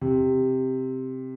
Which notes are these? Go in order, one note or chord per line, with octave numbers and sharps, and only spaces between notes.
C3